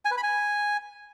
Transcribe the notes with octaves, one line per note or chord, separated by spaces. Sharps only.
G#5
B4
B5
G#5